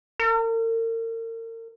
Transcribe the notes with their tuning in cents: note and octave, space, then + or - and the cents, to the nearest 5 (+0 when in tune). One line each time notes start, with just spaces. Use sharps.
A#4 -40